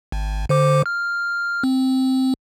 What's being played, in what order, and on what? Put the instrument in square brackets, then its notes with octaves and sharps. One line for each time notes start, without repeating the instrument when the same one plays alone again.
[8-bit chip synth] G#1
D3 C5 D6
F6
C4